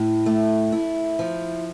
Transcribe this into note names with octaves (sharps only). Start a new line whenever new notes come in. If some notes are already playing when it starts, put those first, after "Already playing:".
Already playing: A2
A3
E4
F3